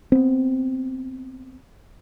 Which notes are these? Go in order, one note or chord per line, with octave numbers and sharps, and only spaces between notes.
B3 C4